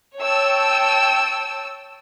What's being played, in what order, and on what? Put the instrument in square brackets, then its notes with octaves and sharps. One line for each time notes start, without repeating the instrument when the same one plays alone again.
[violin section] C#5 G5 A5 E6